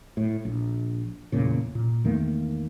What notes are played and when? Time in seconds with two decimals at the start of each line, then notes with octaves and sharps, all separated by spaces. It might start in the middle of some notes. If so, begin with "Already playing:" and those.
0.17 A2
0.45 A#1
1.32 F1 E2 A#2 C#3
1.75 A#2
2.04 E2 D#3 A3 A#3